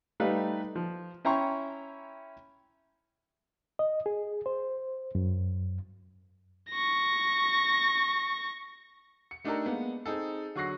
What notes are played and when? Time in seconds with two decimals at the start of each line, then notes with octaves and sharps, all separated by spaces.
0.20 G3 A3 D#4 B4 F5
0.75 F3
1.25 C#4 E4 G5 A#5 C6 C#6
3.79 D#5
4.06 G#4
4.46 C5
5.15 F#2
6.71 C#6 A#6
9.31 C#7
9.44 A3 D4 D#4 G4 A4 A#4
9.66 G#3 A#3 B3
10.06 C4 D#4 G#4 A4
10.55 D3 F#3 C#6 F#6 A#6 C7